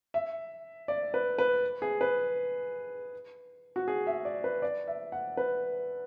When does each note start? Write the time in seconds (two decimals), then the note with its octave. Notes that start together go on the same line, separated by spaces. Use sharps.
0.14 E5
0.88 D5
1.14 B4
1.38 B4
1.82 G#4
2.01 B4
3.76 F#4
3.88 G#4
4.07 E5
4.25 D5
4.44 B4
4.62 D5
4.88 E5
5.12 F#5
5.37 B4